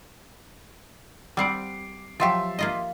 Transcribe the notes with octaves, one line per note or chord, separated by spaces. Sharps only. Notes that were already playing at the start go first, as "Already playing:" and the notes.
G3 C4 F#5 D6 C7 D7
F3 F#3 G4 E5 C6 A6
A#3 F4 D#5